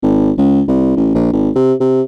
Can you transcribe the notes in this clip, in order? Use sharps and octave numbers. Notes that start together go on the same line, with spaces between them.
G#1
C#2
C2
A1
A#1
G#1
C3
C3